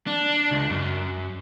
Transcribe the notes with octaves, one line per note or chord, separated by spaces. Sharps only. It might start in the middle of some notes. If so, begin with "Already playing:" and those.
D4
C#2
F#2